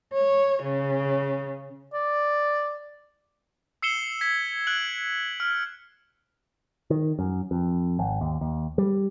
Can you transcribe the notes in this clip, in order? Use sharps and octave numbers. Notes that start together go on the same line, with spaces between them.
C#5
C#3
D5
E6 C7 C#7 E7 G7
G#6 B6
F#6 D7 F#7
F6
D#3
F#2
F2
G#1
D#2
D#2
G3